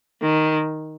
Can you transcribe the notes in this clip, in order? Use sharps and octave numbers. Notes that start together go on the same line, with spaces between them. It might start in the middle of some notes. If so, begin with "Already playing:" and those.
D#3